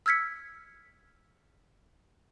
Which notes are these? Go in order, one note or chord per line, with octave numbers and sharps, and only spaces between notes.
E6 F6 G#6 B6 C#7